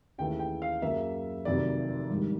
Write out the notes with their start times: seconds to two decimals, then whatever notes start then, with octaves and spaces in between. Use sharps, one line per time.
0.18 D#2 C#3 E3 A3 G5
0.39 G5
0.62 F5
0.82 F#2 C#3 F#3 A#3 E5
1.45 F1 F2 C3 D#3 F#3 D5
2.10 A#1 G#2 D#3 G3